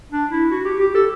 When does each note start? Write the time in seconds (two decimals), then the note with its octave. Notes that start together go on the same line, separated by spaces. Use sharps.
0.12 D4
0.31 E4
0.51 F#4
0.65 G4
0.80 G4
0.95 A4